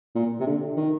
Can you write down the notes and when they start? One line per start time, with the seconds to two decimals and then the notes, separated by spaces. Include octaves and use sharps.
0.15 A#2
0.40 C3
0.47 D3
0.76 D#3